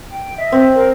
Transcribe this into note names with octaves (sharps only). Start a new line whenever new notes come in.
G5
D#5 E5
C4
A#4 C5